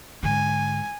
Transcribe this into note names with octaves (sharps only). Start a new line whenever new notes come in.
G#2 D3 G#5